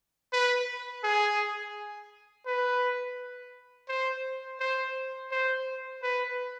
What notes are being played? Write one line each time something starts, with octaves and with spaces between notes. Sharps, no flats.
B4
G#4
B4
C5
C5
C5
B4